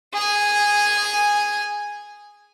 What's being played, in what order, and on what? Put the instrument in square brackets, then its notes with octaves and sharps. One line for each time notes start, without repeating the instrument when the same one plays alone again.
[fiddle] G#4 G#5